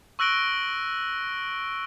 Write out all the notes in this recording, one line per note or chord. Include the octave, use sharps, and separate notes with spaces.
C#6 E6 F#6 A#6 D7 G7